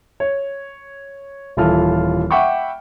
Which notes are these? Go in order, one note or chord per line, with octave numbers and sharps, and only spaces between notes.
C#5
D#1 E3 F4 A4 F6
E5 F#5 G5 B5 C#6 D6